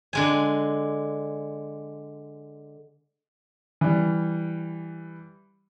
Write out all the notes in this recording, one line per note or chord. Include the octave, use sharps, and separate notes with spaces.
D3 G#3 G#5
E3 G3